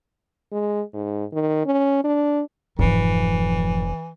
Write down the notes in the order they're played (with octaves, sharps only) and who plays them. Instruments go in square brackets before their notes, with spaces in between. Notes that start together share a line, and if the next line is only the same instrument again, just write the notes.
[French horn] G#3
G#2
D#3
C#4
D4
[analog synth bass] F1 [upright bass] G#2 F3 [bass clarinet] E3